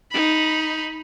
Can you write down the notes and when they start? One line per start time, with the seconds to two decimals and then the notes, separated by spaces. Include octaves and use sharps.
0.12 D#4 B5